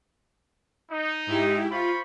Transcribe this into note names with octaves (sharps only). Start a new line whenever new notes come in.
D#4
G#2 E4 G4
F4 C5 B5 C#6